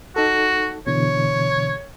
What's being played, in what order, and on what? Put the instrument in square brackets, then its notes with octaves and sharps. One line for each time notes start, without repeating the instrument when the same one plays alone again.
[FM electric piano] D#4 A4 [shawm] F#4
[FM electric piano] B2 D3 E3 [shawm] C#5